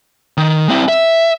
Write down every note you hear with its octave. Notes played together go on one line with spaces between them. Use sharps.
D#3
C4 E4
E5